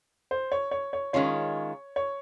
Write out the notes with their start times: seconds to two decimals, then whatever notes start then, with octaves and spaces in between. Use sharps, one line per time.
0.31 C5
0.52 C#5
0.71 C#5
0.93 C#5
1.13 D#3 G#3 C#4 F4 C#5
1.96 C#5